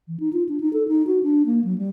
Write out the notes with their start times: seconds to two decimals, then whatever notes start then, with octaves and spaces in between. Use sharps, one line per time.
0.08 E3
0.20 D#4
0.33 F4
0.49 D4
0.60 D#4
0.73 A4
0.88 D#4
1.07 F#4
1.23 D4
1.46 A#3
1.64 F#3
1.78 G3